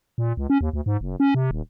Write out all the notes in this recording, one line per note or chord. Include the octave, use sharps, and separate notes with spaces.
A#2
C#2
C#4
D#2
D2
G#2
F#1
C#4
C3
D#1